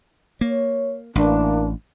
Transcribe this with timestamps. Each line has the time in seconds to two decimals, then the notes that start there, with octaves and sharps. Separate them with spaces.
0.41 A#3 C#5
1.15 A1 E3 A#3 D4